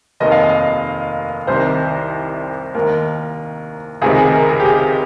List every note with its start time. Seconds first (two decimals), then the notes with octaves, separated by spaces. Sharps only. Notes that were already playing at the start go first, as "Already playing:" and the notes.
0.20 F1 D#2 D#3 D#5
0.32 F5
0.43 D#5
1.47 C2 C3 D#3 C5
2.74 D#2 D#3 A#4
4.02 C#2 C3 D#3 G#4
4.18 G#4
4.34 A#4
4.49 G#4
4.60 G4
4.65 G#4